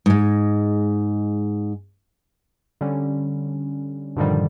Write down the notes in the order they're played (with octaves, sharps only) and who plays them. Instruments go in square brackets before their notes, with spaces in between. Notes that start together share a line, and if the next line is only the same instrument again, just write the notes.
[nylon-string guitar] G#2 G#3
[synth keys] D3 G3 C#4
G2 A#2 D3 D#3 F3 G3